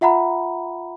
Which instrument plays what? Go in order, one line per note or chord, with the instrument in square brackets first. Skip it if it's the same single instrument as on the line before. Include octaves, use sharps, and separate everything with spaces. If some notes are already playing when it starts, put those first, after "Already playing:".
[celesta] F4 E5 F#5 A#5 B5